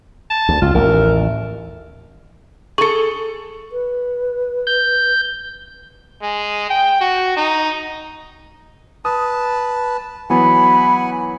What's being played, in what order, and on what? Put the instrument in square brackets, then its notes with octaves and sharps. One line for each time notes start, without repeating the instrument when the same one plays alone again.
[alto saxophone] A5
[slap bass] D2
[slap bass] C#2 [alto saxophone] F4
[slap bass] A1 D#2 [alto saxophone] A#4
[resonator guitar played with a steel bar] G#4 A4 [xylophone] C#6 C#7
[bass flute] B4
[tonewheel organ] G6
[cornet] G#3
G5
F#4
D#4
[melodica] B4 A5 [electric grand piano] D#6
[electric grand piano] E3 F#3 B3 [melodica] F#5 G#5 [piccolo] B5